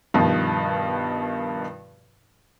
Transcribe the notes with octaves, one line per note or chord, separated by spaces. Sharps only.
G2 B2 D#3 F3